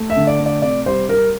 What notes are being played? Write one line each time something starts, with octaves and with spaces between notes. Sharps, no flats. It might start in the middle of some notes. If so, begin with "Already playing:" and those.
Already playing: A3
E5
D3
D5
A3
D5
C3 D5
G3 C5
G3 A#4